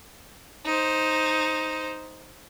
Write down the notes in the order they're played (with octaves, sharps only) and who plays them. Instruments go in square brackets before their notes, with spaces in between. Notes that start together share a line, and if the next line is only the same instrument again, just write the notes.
[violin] D#4 C5